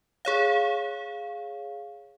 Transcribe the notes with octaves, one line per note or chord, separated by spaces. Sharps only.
G#4 C#5 F5